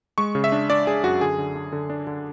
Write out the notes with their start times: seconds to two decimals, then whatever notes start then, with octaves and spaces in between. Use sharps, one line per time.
0.18 G#3 C#6
0.35 C#3
0.44 E5
0.52 D4
0.70 D4 D5
0.87 D4 G#4
1.04 F#2 F#4
1.21 D3 G#4
1.38 D3
1.56 D4
1.73 D3
1.90 D4
2.07 D3